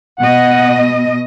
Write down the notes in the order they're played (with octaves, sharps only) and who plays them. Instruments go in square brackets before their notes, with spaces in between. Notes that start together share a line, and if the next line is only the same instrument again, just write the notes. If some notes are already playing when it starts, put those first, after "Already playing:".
[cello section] B2 D#5 [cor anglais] F#5